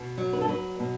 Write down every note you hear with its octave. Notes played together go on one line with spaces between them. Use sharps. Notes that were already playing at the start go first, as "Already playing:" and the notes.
Already playing: B2
F#3
B4
A4
F#3 B4
B2